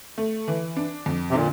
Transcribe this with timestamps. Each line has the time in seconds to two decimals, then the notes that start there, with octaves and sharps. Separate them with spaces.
0.18 A3
0.48 E3
0.76 D4
1.06 F2
1.31 C3
1.34 A#2 D3